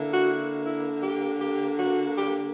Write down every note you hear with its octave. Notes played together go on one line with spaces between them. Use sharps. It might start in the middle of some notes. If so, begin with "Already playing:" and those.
Already playing: D3 A#3 E4
F#4
E4
G4
G4
F#4
G4